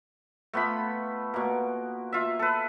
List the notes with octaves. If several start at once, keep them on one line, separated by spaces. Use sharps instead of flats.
A3 B3 F4 B5
B2 A#3
F4 E5
A4 B4